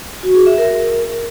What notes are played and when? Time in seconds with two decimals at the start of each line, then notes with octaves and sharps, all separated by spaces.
0.23 F#4
0.35 G#4
0.46 E5
0.58 A#4